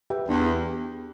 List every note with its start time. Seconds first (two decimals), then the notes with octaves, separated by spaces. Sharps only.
0.10 G4 B4 E5 G5
0.29 E2 D4
0.48 G4